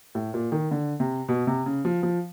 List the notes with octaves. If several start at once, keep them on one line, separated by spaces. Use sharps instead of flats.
A2
A#2
D#3
D3
C3
B2
C3
C#3
F3
F3